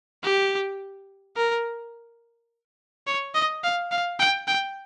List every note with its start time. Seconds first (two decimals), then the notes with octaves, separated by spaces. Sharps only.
0.23 G4
1.36 A#4
3.07 C#5
3.34 D#5
3.64 F5
3.92 F5
4.20 G5
4.48 G5